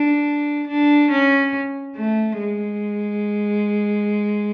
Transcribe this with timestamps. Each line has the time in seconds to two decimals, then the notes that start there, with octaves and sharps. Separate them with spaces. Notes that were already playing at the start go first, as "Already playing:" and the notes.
Already playing: D4
0.68 D4
1.11 C#4
1.96 A3
2.39 G#3